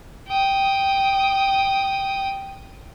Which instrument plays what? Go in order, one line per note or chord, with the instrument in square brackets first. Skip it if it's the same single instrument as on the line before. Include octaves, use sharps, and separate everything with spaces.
[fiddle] G5 D#6